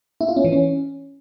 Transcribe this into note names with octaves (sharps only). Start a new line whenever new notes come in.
E4
F4
C#4
E3
C#4